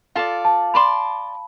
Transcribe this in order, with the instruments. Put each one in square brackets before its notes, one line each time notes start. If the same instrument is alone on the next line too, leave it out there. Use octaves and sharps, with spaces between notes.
[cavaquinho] F4 A4 D5 [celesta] F5
[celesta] A5
[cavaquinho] D5 A5 C6 [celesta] B5